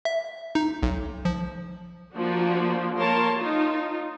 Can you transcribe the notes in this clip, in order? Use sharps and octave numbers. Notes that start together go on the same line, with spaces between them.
E5
D#4
B1
F3
F3 A#3 D4 F#4
A#3 A#4 C#5 A5 C6
D#4 F4